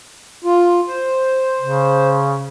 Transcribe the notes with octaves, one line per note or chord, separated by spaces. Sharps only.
F4
C5
C#3